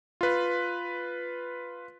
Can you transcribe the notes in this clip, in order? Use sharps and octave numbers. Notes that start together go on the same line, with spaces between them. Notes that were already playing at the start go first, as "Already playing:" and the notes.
F4 B4